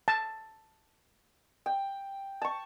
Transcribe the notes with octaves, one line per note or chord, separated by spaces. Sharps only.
A5
G5
A5 C#6